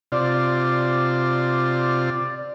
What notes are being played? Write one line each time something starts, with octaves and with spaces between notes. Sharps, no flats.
C3 F4 D5